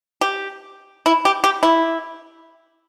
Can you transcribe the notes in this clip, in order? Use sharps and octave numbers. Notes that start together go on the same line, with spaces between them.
G4
E4
G4
G4
E4